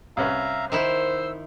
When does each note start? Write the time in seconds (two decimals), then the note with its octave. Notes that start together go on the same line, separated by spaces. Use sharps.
0.17 C2 C#4 B4 E5 F5 A#5
0.72 D#3 D#4 E4 C5 E6